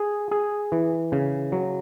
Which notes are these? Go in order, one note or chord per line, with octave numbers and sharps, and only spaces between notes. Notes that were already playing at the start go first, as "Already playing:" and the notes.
Already playing: G#4
G#4
E3
C#3
F#3